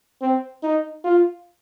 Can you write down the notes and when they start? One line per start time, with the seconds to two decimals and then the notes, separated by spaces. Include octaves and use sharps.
0.22 C4
0.63 D#4
1.04 F4